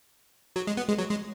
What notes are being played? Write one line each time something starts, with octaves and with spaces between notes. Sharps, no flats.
F#3
G#3
B3
G#3
F#3
G#3